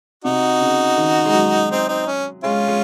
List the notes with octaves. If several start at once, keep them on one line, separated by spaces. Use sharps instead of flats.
C3 D#4 F#4
C#3
D#3
G#3
F#3
C4 D#4
C4 D#4
C#4
G#3 C#4 F4
G#3